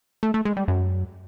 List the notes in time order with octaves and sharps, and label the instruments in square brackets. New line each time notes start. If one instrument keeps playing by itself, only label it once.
[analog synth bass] A3
A3
G#3
G3
F#2